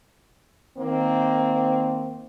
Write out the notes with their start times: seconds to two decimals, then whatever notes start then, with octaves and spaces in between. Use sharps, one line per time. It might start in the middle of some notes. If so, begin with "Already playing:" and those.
0.78 D#3 A#3 C4